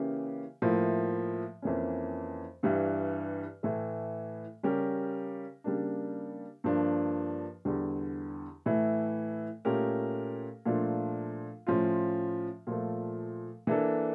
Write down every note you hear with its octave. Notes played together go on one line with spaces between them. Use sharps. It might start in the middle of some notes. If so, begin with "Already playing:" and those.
Already playing: C#3 E3 A#3 C#4 G4
A2 F3 A#3 E4
F2 E3 A#3 C#4
G2 E3 G3
A2 E3 A3
C#3 G3 C#4 G4 A#4
C#3 G3 A#3 D4
G2 F3 A#3 D4
E2 D3 G3
A2 E3 A3 E4
A#2 A3 C#4 G4 A#4
A#2 F3 A3 D4 F4
A2 F3 C#4 F4
A#2 F3 A3
E3 A#3 D4 A4